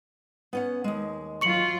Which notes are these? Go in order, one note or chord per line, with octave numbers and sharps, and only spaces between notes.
B3 C#4 F#5
D#2 G#3
F#3 F4 C#6 C#7 F#7